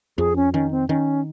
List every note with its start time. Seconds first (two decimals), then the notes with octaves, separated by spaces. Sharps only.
0.18 F2 G#4
0.36 C#4
0.53 D#3 C#4
0.71 C4
0.89 D#3 C#4